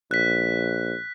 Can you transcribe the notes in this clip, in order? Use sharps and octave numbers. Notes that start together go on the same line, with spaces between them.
A#1 F#6 B6